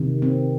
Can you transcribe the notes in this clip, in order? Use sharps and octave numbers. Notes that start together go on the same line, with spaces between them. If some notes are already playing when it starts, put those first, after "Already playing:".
Already playing: C3 D#3
C4